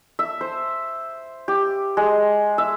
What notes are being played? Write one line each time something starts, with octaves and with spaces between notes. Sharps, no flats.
E5
C5
G4
G#3
E5